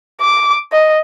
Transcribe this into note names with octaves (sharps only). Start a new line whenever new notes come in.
D6
D#5